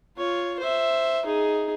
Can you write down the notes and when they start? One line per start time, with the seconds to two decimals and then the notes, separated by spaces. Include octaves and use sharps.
0.17 F4 C#5
0.59 C5 E5
1.25 D#4 G#4